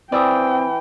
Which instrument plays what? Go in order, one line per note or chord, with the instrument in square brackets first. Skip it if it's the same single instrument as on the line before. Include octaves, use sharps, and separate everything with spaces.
[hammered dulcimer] E3 [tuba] C4 [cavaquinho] D5 E5 D#6 [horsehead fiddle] G5